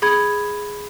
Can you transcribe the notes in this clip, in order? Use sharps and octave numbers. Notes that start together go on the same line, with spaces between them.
G#4 B5 G#6